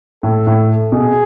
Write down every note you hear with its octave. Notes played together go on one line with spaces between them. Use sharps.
A2 A4
A2
B2 G#4